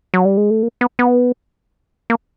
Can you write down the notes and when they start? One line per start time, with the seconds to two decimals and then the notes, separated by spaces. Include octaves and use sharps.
0.14 F#3
0.25 G3
0.37 G#3
0.50 A3
0.63 A#3
0.81 B3
0.99 B3
2.10 A#3